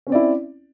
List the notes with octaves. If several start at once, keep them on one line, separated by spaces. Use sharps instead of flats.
C4 C#4 E4 D5